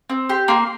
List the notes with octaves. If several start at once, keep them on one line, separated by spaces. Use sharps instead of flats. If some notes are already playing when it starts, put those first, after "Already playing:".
C4
G4 C6
A#3 C6